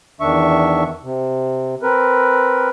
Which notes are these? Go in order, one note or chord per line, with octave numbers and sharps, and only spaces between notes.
E2 D#3 D4 E5 C#6
C3
C4 A#4 B4